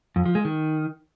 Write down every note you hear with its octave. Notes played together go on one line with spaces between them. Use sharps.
F2
F3
G#3
D#3